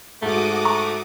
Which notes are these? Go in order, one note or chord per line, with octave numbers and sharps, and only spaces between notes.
G#2 A3 F#4 D6 D#6
A#5 C#6